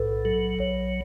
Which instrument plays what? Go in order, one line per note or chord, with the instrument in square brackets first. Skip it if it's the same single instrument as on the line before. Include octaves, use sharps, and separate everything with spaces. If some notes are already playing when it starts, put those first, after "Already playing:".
Already playing: [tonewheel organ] B1 A2 [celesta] A4 B4
[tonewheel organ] F#3 [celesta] A4
[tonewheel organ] B1 [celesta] C#5